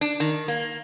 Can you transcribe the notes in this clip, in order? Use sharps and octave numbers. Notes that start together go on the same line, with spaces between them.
D4
D#3
A#3